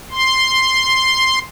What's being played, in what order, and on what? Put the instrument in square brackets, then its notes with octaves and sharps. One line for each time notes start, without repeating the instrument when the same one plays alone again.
[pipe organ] C6